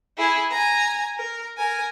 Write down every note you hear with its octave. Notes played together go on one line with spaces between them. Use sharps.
E4 G#4
G#5 A#5
A#4
A#4 G#5